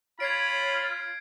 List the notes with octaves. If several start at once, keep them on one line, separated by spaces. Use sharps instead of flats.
F4 C#5 B5 G#6 C7 D7